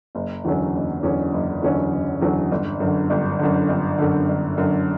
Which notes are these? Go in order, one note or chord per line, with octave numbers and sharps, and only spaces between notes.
F#1
E2 D3 F#3 C#4
F#1
E2 D3 F#3 C#4
F#1
E2 D3 F#3 C#4
F#1
E2 D3 F#3 C#4
G1
F#2 D3
G1
F#2 D3
G1
F#2 D3
G1
F#2 D3